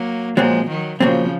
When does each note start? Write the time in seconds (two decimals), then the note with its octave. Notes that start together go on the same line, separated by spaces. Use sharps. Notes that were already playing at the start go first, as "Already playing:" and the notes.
Already playing: F#3 A#3
0.37 A#2 F3 F#3 G#3 C4
0.68 D#3 F#3
1.00 A#2 C#3 F3 F#3 C4